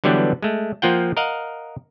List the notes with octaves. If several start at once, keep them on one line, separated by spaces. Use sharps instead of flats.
D3 E3 F#3 G3 B3 D4
G#3 A3
F3 A#3 F4 F#5 G5
A#4 D#5 F5 F#5